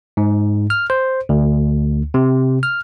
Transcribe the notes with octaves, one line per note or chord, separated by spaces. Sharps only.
G#2
F6
C5
D2
C3
F6